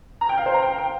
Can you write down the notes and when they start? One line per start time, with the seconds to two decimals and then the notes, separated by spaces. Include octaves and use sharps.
0.21 A#5
0.29 G5
0.38 F5
0.46 C5
0.54 A#5
0.63 G5
0.78 G5